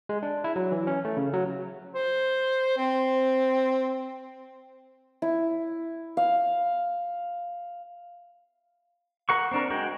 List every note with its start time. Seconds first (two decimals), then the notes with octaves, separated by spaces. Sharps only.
0.09 G#3
0.23 D4
0.44 E4
0.56 F#3
0.72 E3
0.87 C#4
1.05 A3
1.17 C#3
1.33 F#3
1.95 C5
2.77 C4
5.22 E4
6.17 F5
9.29 A#4 F#5 C#6
9.51 C4 D4 A#4
9.70 G#3 F#4 A#4 G5